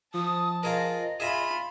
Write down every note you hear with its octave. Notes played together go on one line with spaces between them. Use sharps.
F3 A5 D#6
F4 G#4 A#4 D#5
F4 G#4 E5 G#5 B5